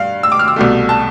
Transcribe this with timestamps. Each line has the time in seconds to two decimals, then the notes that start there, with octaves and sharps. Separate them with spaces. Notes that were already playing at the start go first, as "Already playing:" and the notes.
Already playing: G2 F5
0.23 E6
0.32 D6
0.39 F6
0.48 E6
0.56 C2 B2 A3
0.89 A5